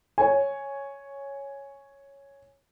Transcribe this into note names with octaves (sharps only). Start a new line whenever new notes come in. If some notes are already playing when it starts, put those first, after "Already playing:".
C#5 G#5